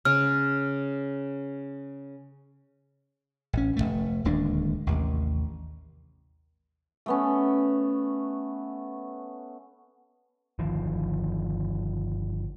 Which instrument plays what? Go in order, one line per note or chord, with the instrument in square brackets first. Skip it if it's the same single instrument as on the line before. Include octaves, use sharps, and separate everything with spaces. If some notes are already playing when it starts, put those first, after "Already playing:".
[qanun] C#3 [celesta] F6
[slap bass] A1 C#4
F1 E2 A3
D1 D#2 G#3 D4
A1 D#2 C3
[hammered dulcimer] A3 B3 C#4
[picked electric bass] G1 D#3 F3